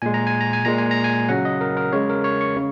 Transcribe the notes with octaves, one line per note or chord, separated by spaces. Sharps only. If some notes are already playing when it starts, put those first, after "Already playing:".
A#2 G#3 G#5
A#5
G#5
A#5
G#5
A#2 G#3 A#5
G#5
A#5
G#5
C#3 F#3 F#5
D#5
A#4
A#4
C#3 G#3 C#5
A#4
C#5
C#6
C#3